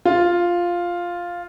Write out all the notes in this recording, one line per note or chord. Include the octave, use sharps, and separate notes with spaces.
F4